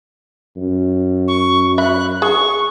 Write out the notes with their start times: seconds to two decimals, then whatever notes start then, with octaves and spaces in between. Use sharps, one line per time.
0.57 F#2
1.28 C#6
1.78 E5 B5 F#6
2.22 G#4 C#6